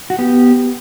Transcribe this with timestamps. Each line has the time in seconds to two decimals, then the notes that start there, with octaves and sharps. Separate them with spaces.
0.10 F#4
0.19 B3 G4